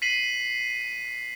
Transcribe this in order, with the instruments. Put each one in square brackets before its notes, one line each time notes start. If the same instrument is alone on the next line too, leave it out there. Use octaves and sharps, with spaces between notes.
[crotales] B6 C7 D#7 F#7